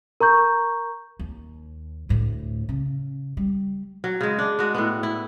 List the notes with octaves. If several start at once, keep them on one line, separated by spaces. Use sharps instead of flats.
A#4 A#5 C#6 G6
D#2
D2 A2
C#3
G3
F#3
C#3 G#3
D4
G#3 F#4
A2 B3
E4